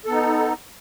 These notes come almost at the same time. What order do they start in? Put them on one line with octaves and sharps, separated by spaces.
A4 B3 D#4